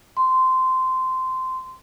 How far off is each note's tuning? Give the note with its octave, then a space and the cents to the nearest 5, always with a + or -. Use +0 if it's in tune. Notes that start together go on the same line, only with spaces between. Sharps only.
C6 -15